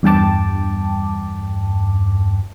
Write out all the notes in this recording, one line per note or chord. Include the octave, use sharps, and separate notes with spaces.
E2 G2 G5 A5 D6